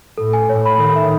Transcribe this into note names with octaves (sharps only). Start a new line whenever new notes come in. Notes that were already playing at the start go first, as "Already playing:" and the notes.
A2 A4
G#5
A2 C#5
B5
D#3 A4
E5